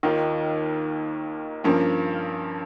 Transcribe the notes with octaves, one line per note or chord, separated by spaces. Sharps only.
D#2 D#3 A#3 F4
G2 F3 A#3 C#4